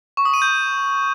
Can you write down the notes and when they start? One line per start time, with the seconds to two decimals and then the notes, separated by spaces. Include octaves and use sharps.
0.17 C#6
0.25 D#6
0.34 D#7
0.42 G6